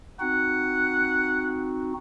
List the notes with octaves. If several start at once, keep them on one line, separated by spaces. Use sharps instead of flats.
C4 D#4 F#4 F#5